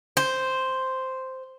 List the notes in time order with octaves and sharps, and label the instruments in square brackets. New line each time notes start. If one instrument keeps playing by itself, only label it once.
[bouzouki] C5